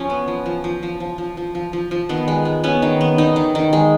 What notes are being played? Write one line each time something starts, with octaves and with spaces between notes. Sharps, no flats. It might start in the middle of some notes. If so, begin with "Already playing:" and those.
Already playing: F3 C#4
B3
F3
F3
F3
F3
F3
F3
F3
F3
F3
F3
D#3 B3
G#3
G#3
B3 C#4
D#3
B3
D#3 D#4
D#3
D#3
G#3